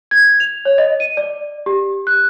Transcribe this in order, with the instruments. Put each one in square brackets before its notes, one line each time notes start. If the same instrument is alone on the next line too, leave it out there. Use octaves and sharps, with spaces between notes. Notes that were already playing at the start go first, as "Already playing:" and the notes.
[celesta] G#6
F7
C#5
D#5
D#7
D5
G4
F#6